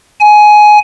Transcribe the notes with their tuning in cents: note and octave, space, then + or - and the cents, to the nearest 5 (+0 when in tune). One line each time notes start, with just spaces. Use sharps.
G#5 +15